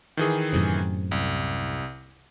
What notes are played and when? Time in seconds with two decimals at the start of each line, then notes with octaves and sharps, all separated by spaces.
0.17 D#3 E3 G#4
0.53 F#2 A2 C3
1.11 C2